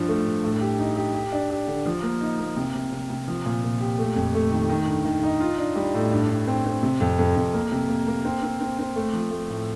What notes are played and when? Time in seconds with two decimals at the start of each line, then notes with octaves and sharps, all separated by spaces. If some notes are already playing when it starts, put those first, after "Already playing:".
Already playing: G2 F3
0.08 A3
0.26 G2
0.44 A2
0.61 G4
0.79 D#4
0.96 G4
1.15 G4
1.32 D4
1.50 G4
1.68 D3
1.86 F3
2.03 A#3
2.21 D#4
2.39 A#3
2.57 C3
2.75 C3
2.92 C3
3.10 C3
3.28 F3
3.46 A#2
3.64 A#2
3.81 G4
3.99 A3
4.16 F2
4.35 A3
4.51 D#3
4.69 D#3
4.87 G2
5.05 D#3
5.23 D#4
5.40 F4
5.58 D4
5.76 G3
5.95 A2
6.12 G2
6.29 G2
6.48 C4
6.66 C4
6.83 C3
7.01 F2
7.19 F2
7.36 F2
7.54 A#3
7.72 C3
7.89 A#3
8.08 A#3
8.25 C4
8.43 C4
8.61 C4
8.79 C4
8.96 A3
9.13 F3
9.31 A3
9.50 A2